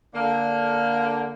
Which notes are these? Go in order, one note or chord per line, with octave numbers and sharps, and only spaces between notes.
D3 A#3